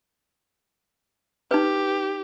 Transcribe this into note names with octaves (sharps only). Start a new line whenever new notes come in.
D#4 G4 B4